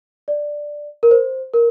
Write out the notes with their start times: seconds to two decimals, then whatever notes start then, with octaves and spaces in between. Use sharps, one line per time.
0.28 D5
1.03 A#4
1.11 C5
1.54 A#4